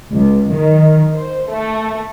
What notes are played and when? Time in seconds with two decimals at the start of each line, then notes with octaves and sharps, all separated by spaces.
0.11 C#2
0.51 D#3
1.14 C5
1.51 A3